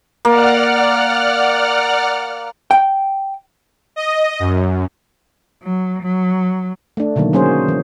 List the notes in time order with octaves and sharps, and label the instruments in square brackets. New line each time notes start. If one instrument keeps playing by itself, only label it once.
[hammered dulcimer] A#3 [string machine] D5 F#5 F6
[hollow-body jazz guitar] G5
[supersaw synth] D#5
F#2
[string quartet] F#3
F#3
[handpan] A3 D4
B2 D3 D#3 F#3 A#3
F#3 A#3 C#4 G#4 C5
E3